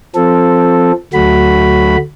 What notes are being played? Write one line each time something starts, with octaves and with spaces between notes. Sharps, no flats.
F3 C4 A4
D2 F#3 A3 F#4 B5